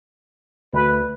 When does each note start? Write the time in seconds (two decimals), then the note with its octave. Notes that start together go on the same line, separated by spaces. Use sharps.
0.74 D2 B4